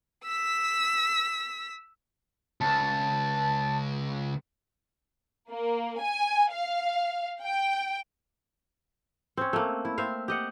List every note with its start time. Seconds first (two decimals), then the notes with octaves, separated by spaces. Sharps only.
0.24 E6 B6
2.61 C#2 A5
5.50 A#3
6.01 G#5
6.52 F5
7.43 G5
9.37 C4 C#4
9.53 A3 A#3
9.85 E4
9.98 C4 E5 F5
10.28 G4 D#5 F#5